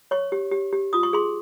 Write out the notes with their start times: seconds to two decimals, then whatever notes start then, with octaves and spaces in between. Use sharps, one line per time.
0.11 C#5 C#6
0.32 G4
0.52 G4
0.73 G4
0.93 F4 D#6
1.03 C#6
1.13 G#4 C6